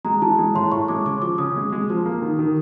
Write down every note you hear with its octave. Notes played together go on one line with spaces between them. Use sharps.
G#3 A#5
E3 A5
G#3
A2 C6
A2 C#6
G#3 D6
C#3 D6
F3 D6
C#3 D#6
G#3
G#3
F3
A#3
D#3
D#3